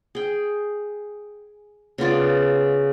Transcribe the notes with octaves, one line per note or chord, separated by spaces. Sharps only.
G#4 G5
C#3 B3 F4 D5